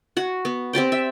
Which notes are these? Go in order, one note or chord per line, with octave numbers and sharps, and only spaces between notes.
F#4 F#5
B3
C4 G4 D5 G5
E5